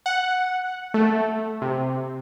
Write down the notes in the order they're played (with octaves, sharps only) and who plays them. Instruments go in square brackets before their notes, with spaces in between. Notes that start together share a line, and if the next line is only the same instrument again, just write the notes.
[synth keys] F#5
A3
C3